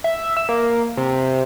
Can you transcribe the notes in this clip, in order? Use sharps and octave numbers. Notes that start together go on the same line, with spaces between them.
E5
E6
A#3
C3